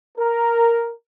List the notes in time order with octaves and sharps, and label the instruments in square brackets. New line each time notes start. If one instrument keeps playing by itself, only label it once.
[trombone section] A#4